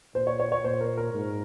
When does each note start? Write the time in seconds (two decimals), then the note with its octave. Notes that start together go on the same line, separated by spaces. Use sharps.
0.15 A#2 C5
0.27 C#5
0.40 C#5
0.52 C#5
0.64 A#2 C5
0.81 A#4
0.97 A#4
1.14 G#2